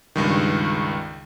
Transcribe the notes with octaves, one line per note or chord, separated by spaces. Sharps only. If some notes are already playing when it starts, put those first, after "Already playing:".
C#2 G2 D#3